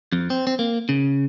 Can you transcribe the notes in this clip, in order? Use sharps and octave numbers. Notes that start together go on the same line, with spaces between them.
F2
C4
C4
A#3
C#3